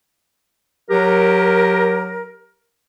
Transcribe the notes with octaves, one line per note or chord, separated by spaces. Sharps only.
F#3 G4 A#4